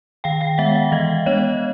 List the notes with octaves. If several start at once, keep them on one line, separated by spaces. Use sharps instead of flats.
D#3 F5 G5
F5 G5
G#3 B3 E5 F#5
E5 F#5
E3 D#5 F5
G#3 B3 D4 C#5 D#5